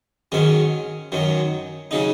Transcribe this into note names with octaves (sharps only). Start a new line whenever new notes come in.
G#2 D#3 F#3 C#4
F#2 D#3 F#3
C#3 F#3 D#4